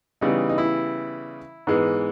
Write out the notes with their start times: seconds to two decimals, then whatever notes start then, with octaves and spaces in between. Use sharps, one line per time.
0.21 C#3 E3 G3 B3 D#4
0.49 D#4
0.58 E4
1.67 G#2 E3 G#3 B3